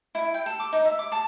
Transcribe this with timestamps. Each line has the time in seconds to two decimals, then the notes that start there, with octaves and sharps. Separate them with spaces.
0.15 E4
0.34 G5
0.46 A4
0.60 D6
0.73 D#4
0.85 E5
0.99 D6
1.12 A5